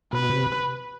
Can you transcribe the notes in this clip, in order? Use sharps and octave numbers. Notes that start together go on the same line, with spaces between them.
B2 B4
C3